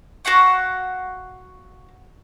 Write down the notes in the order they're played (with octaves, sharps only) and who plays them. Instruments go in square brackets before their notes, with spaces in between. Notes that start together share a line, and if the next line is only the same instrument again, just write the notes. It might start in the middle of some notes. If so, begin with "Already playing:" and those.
[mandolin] F#4 F5 F#5 C#6